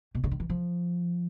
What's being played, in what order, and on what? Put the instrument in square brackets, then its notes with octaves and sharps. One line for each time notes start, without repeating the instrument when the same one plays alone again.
[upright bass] B2
C#3
D#3
E3
F3